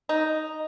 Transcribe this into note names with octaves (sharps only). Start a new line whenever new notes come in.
D#4